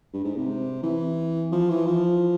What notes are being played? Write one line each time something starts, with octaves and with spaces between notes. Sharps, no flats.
G2
G#2
C3
E3
F3
E3
F3